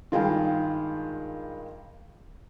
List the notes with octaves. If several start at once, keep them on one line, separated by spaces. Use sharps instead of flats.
G2 D#3 G#3 F4 F5 G5